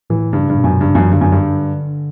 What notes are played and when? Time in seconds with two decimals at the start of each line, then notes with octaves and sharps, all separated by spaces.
0.10 A2 E3
0.33 G2 C#3
0.50 G2
0.57 B2
0.64 F#2
0.72 B2
0.80 G2 C#3
0.95 F#2 E3
1.11 G2 D3
1.21 F#2
1.32 G2